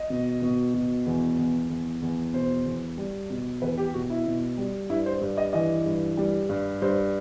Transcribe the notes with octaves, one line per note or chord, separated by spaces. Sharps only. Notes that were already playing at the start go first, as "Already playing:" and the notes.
Already playing: D#5
B2
B2
B2
E2
E2
E2
E2
B2 C5
E2
G3
B2
E2 B4
G4
B2 F#4
E4
B2
G3
G2 E4
C5
G2
D#5
E3 D#5
G2
G3
G2
G2 C5